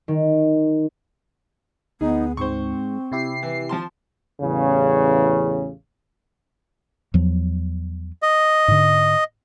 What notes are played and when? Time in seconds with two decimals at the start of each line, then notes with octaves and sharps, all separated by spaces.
0.08 D#3
2.01 D2 B3 D#4 G#4
2.37 G#2 C4 C5 C#6
3.12 C3 E4 G4 C7
3.43 E3
3.69 F3 A5 C6
4.41 A1 E2 C#3
7.14 E2 F3 F#3
8.23 D#5
8.68 G#2 D3